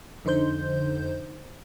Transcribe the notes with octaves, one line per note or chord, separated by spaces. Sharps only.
F2 D3 D#4 C5 G6